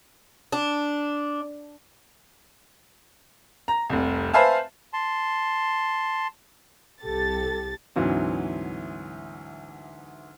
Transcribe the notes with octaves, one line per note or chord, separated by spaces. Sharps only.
D4
A#5
F1 C2
B4 C5 E5 F5 G#5 A5
A5 C6
C2 G4 A4 A6
D2 G#2 E3 F#3 C4